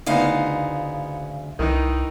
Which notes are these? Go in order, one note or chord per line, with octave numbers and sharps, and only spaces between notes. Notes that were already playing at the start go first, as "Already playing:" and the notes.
D2 C#3 B3 D#4 E4 F5
C2 D#3 E3 D#4